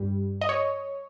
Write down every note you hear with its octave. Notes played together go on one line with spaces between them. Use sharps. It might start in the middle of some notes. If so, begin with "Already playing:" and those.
Already playing: G2 G3
D#5
C#5